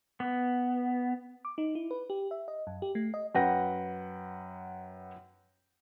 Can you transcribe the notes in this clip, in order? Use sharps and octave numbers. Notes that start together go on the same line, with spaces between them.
B3
D6
D#4
E4
B4
G4
E5
D#5
F#2
G4
A3
D#5
F#2 B4 F#5 G5 A#6